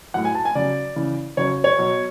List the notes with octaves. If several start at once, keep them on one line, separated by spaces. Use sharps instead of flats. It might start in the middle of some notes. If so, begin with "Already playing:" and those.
A2 F#3 F#5
G#5
A5
G#5
C#3 F#3 D5
C#3 E3
C#3 F#3 C#5
C#5
B2 F#3